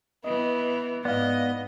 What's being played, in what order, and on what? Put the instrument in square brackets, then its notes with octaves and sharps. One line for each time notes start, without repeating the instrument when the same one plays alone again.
[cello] E3 [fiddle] B3 [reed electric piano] D#5
[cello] G#2 [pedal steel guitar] B3 [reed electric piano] D5 F5 [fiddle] D#5